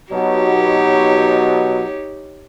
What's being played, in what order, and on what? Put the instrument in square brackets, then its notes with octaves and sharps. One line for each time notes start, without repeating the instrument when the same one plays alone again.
[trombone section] B2 F#3 [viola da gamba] D#4 G4 C#5